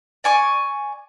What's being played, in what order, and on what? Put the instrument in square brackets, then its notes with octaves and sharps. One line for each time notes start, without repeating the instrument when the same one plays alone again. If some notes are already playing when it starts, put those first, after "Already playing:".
[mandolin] D5 G#5 C#6 D6